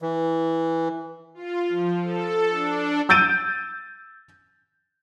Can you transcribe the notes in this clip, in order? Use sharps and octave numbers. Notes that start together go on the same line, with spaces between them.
E3
F4
F3
A4
D4
E6 G6 A6 D7 D#7